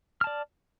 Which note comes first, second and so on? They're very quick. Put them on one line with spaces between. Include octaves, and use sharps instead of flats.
F6 A5 D5